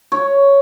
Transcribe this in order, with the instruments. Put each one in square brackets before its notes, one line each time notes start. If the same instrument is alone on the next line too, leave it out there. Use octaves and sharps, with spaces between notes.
[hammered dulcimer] C#5